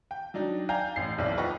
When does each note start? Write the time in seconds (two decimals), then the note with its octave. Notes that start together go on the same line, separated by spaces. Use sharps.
0.11 G5
0.34 F#3 D4 D#4
0.69 D5 F5 G5 G#5 A#5 G6
0.96 A1 C7
1.18 D#1 B1 E3 D5
1.38 F4 B4 D#5 F#5 G5 C#6